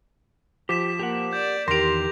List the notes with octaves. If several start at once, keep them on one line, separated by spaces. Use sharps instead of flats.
F3 G4 D6 B6 E7
A#3 G4 A#4 F#5
D5 G6
E2 D#3 G4 A#4 C6 A#6 D7 F7